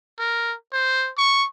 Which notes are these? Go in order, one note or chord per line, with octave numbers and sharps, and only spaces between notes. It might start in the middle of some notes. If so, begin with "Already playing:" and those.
A#4
C5
C#6